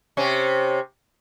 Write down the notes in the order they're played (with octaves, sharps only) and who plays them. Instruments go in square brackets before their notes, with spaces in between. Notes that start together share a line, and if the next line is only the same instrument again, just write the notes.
[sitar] C3 C#4